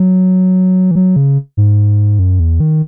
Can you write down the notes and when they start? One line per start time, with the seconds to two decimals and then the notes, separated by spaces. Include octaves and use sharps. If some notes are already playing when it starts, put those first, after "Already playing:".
Already playing: F#3
0.91 E3
0.95 F#3
1.16 C#3
1.57 G#2
2.19 F#2
2.40 E2
2.60 D#3